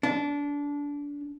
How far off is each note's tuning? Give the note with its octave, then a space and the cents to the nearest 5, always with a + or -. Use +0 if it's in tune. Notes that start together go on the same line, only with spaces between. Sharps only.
D4 -25